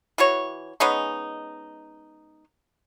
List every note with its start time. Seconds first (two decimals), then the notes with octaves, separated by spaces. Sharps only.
0.18 E3 F#4 C#5
0.80 G#3 B3 C#4 D#4